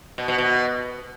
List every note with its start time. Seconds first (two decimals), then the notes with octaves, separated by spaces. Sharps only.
0.18 B2
0.28 B2
0.38 B2